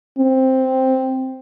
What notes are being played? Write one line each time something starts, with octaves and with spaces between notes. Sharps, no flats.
C4